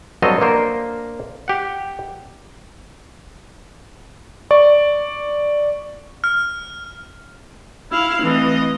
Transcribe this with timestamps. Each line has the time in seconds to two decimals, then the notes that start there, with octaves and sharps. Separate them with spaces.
0.22 G2 F#3 C4 A4 D#5 F5
0.41 A#3 D4 A#4 C5
1.48 G4 F#5
4.51 D5 C#6
6.24 F6
7.92 E4 F5
8.22 E3 A3 C4 D#5